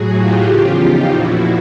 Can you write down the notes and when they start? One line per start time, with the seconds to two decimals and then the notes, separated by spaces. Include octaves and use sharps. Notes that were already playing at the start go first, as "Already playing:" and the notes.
Already playing: A2 F#3 F#4 G#4
0.14 F4 G4
0.46 E2 C#3 F3 F4 G4
0.77 D#4 F4
1.09 A#2 F3 E4 F#4